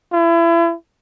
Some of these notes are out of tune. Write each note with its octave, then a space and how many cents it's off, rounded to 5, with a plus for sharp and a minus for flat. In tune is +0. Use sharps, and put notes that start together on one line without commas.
E4 +35